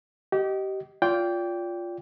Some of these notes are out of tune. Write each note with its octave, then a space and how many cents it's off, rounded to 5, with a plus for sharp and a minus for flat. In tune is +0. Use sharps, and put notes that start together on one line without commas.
G4 -25 D#5 +0
F4 +0 D5 -30 G5 +0